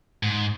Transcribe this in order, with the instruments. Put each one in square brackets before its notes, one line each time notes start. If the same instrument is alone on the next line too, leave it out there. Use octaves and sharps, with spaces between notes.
[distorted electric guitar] G#2